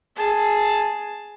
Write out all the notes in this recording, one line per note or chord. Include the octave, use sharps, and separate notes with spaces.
G#4 A5